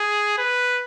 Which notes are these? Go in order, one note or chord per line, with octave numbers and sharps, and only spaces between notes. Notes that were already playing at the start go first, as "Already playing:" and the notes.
Already playing: G#4
B4